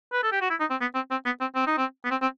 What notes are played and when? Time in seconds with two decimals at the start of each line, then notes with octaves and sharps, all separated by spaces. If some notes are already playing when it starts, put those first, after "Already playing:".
0.13 B4
0.23 A4
0.32 G4
0.41 F#4
0.50 E4
0.60 D#4
0.70 C4
0.81 B3
0.95 C4
1.11 C4
1.25 B3
1.41 C4
1.55 C4
1.67 D#4
1.78 C4
2.05 B3
2.11 C4
2.22 C4